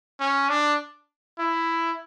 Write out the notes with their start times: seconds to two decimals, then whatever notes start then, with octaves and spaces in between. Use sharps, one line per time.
0.20 C#4
0.49 D4
1.39 E4